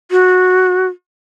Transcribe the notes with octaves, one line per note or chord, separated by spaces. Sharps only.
F#4